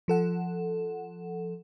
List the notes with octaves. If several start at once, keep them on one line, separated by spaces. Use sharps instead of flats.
F3 A4 F#5